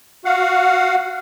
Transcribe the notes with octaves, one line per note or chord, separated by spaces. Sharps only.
F#4 F5 F#5